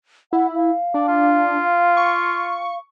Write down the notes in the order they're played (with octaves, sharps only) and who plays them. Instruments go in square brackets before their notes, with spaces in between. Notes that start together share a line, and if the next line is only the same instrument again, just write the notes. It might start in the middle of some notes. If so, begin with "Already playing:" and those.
[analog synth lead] E4 [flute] F#5
[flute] F5
[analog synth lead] D4 [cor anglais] D5
[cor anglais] F4
[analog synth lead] C#6